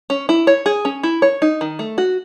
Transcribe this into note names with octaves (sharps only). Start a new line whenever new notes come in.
C#4
E4
C#5
G#4
C#4
E4
C#5
D#4
D#3
A3
F#4